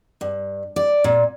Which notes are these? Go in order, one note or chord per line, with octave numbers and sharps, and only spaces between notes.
G2
D5
A#2